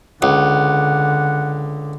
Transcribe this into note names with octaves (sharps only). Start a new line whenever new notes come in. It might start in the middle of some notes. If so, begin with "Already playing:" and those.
C#2 D3 F#5